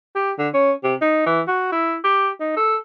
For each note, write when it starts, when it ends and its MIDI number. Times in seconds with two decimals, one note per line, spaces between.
0.16 0.31 67
0.38 0.49 50
0.54 0.72 61
0.83 0.95 48
1.02 1.22 63
1.26 1.41 52
1.48 1.68 66
1.72 1.95 64
2.04 2.29 67
2.40 2.52 63
2.57 2.76 69